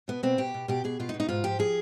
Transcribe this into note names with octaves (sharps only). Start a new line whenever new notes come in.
B2 B3
B2 C4
B2 G4
B2
B2 G4
B2 G#4
B2 F4
D#4
B2
D#4
G#2 F4
F3 G4
F3 G#4